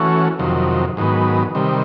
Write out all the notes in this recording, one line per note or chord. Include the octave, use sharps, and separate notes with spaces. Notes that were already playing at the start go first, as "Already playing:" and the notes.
Already playing: E3 A3 C#4 F#4
F2 C3 D#3 F#3
G#2 D#3 F#3 B3
C3 D#3 G3